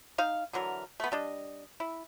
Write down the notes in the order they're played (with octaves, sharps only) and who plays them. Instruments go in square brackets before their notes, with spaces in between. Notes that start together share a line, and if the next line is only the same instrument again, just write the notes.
[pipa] D#4 F5
D3 E3 F#3 A#4
A3 B3
G3 D4 D#5
E4